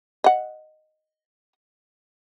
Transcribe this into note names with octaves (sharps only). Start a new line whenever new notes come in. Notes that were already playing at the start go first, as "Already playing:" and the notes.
D#5 F#5